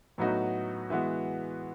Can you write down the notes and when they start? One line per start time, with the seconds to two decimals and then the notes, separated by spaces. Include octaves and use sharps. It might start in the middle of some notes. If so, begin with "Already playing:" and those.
0.18 A2 F#3 B3 D#4 F#4
0.90 E3 G#3 B3 F#4